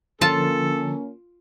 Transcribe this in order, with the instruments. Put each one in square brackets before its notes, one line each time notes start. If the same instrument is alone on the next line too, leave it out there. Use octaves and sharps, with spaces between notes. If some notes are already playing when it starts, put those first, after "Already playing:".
[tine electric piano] D3 F3 [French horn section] A#3 C#4 [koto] F4 A5 [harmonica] A4